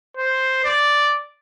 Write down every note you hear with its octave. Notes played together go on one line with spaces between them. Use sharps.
C5
D5